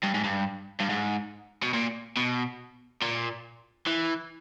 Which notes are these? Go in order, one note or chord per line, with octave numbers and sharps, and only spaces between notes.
G2
G#2
G2
G2
G#2
B2
A#2
B2
A#2
E3